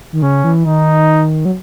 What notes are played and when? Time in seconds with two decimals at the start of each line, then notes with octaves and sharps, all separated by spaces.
0.12 D#3
0.23 C#3 C#4
0.44 E3
0.65 D#3 D#4
1.45 F#3